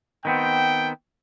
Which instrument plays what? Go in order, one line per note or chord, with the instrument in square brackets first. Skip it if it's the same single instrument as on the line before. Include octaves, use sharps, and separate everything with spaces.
[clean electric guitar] D#3 B3 C4 [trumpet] G5